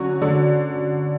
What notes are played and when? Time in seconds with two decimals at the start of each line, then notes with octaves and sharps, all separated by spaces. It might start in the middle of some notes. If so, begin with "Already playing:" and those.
Already playing: D3 F#3 C#4 F#4
0.22 D3